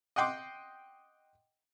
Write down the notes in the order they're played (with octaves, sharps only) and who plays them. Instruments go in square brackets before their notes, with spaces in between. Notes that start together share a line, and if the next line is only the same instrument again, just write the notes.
[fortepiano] D#5 F#5 G5 C6 D6